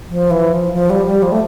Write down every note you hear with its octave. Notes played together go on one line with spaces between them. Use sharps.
F3
E3
F3
F3
G3
G3
F3
A3